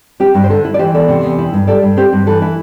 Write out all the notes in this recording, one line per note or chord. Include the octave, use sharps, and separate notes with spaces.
C4 G4
G2
C5
D3 A4
E4
D5
E3 G4 C5
E2 A4 D5
C3
E2
E4
G2
G3 A4 D5
G2
C4 G4 C5
G2
E3 A4
E4